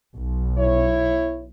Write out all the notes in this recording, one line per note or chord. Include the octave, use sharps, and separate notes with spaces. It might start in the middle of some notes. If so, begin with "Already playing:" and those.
B1
E4 C#5